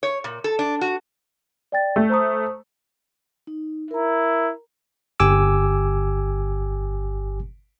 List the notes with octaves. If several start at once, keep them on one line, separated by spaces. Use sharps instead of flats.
C#5
A#2
A4
D4
F#4
D5 G5 A6
A3
C5 A#5 D#6
D#4
E4 A#4 A#5
G1 G4 G#5 D6 E6